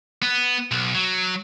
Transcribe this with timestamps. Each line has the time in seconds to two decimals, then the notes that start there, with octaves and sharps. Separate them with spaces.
0.22 B3
0.71 B1
0.95 F#3